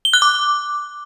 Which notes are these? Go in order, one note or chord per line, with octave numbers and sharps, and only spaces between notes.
G7
F#6
D6